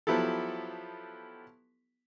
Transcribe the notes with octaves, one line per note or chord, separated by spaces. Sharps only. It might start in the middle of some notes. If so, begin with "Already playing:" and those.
F3 F#3 B3 E4 G4 A4